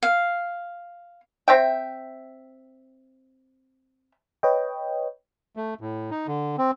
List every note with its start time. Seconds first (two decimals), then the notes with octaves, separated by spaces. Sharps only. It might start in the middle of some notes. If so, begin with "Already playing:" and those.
0.03 F5
1.48 C4 E5 G5
4.43 B4 C#5 D#5 G5
5.57 A3
5.81 A2
6.11 D#4
6.27 D3
6.58 C4